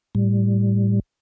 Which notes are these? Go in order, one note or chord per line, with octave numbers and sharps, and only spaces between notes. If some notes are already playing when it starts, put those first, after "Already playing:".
A2 G3